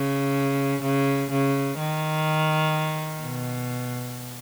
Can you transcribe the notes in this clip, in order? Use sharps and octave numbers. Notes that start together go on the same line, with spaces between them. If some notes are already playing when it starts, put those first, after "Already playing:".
Already playing: C#3
C#3
C#3
D#3
B2